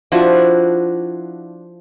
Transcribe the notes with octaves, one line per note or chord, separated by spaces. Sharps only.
F3 D4 E4 F#4